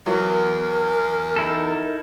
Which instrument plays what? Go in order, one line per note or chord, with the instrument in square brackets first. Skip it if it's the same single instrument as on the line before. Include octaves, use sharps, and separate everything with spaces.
[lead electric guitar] E2 [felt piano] E3 F#3 [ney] A#4
[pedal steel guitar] D#4 E4 A4